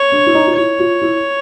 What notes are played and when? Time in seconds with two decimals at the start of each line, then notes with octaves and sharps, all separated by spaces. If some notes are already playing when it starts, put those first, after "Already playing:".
Already playing: C#5
0.12 D4
0.27 E4
0.35 D#4
0.47 F4
0.57 E4 C#5
0.80 F4
1.02 E4